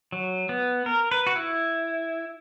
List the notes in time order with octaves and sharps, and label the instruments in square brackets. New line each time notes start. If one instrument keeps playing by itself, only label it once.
[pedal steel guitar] F#3
B3
A#4
B4
F#4
E4